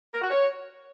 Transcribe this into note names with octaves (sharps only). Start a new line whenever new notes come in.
A#4
F#4
C#5